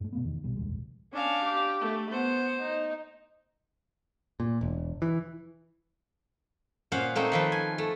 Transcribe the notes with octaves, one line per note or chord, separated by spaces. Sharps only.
G#2 A3
B2 A3 B3
E2 D#3
B1 B2 G3
F1 A#1 D#2 G#3
C#4 D4 F5
G4
A3
B3 C5
D#4
A#2
E1
E3
A#2 C#4 C5 F5 F#5
A3 A#3 C4 D#4
D#3 F3 B4
G#5
A3